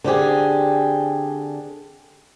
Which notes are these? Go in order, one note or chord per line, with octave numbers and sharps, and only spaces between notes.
D3 C4 G4 G#4